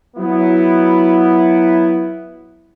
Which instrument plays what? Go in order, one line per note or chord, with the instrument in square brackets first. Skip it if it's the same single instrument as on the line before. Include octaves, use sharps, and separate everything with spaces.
[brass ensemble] F#3 B3 E4